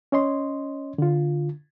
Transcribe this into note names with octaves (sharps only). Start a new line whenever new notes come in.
C#4 C#5 D#5 C6
D3 F4